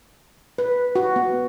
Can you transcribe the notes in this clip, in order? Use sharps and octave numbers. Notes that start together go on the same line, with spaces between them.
B4
F#4
B3